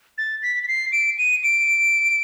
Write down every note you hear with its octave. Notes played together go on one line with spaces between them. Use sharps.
A6
B6
B6
C7
D7
D#7
D7